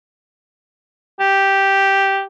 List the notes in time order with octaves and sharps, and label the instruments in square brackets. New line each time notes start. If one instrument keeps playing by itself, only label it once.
[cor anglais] G4